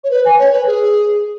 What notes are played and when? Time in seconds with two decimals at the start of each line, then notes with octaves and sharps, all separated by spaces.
0.04 C#5
0.11 B4
0.25 G#5
0.39 C#5
0.52 B4
0.67 G#4